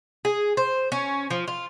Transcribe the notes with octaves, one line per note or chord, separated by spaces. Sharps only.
G#4
C5
C#4
F3
F4